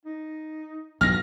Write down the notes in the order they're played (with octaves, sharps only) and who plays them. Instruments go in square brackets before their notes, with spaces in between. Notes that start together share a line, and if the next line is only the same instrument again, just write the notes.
[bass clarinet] D#4
[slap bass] B1 [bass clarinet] G2 [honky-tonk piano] F6 A#6